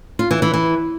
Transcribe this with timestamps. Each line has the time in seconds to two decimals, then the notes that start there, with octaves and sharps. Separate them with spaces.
0.19 F4
0.31 E3
0.42 E3
0.54 E3